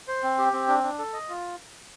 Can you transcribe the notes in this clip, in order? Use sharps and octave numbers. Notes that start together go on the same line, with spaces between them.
C5
C4
G4
C4
D4
D4
A4
D#5
F4